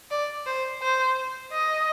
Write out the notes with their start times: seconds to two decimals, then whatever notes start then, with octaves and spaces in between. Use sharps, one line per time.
0.11 D5
0.46 C5
0.82 C5
1.53 D#5